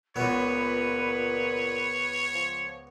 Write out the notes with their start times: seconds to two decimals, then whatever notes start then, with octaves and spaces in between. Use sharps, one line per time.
0.16 C#2 A#2 B3 B4 C#5
2.35 F3